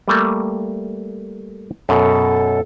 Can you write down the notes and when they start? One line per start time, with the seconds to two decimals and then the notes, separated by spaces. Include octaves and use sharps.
0.08 G3 A3 A#3
1.89 F#2 B2 A4